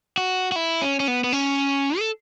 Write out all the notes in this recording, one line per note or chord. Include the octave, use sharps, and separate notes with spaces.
F#4
F#4
E4
C#4
C#4
B3
B3
C#4
A4